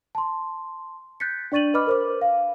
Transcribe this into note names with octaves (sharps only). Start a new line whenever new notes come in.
A5 C6
F#6 G6 A6 B6 C#7
D4 D5 C#6 A6 D#7 F#7
B4 D#5 B5 D6 F6
A#4 C5 D6
F5